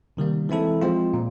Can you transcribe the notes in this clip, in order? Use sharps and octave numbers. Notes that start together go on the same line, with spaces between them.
C3 D#3 G3 A#3
E3 G#3 C4 E4 A4
F3 G#3 C4 F4
A#2